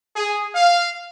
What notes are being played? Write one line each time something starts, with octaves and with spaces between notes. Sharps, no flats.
G#4
F5